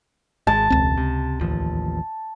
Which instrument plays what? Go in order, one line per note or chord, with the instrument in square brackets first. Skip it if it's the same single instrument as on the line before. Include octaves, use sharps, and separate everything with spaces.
[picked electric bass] G#1 G#3 [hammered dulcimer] A5
[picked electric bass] E1 [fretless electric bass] C#2 C4
[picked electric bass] C3
A1 D#2 F3